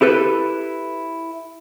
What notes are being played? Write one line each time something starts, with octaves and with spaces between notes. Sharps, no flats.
E4 G4 A4 B4